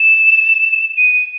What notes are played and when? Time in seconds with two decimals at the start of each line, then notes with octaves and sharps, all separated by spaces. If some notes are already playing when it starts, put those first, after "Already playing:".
Already playing: E7
0.97 D#7